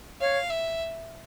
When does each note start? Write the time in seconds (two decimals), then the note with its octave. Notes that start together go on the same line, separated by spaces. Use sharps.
0.20 C#5 F5
0.50 E5